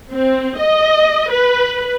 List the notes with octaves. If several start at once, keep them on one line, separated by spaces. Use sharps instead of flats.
C4
D#5
B4